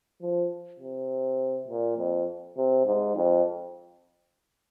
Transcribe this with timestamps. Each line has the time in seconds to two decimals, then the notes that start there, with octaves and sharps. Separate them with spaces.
0.21 F3
0.80 C3
1.68 A#2
1.98 F2
2.57 C3
2.86 G#2
3.15 F2